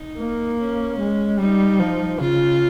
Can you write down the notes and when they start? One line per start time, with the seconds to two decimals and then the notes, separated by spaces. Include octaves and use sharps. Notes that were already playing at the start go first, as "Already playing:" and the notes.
Already playing: D#4
0.18 A#3
0.59 C#4
0.99 G#3
1.39 G3 D#4
1.80 F3
2.19 C#3 F4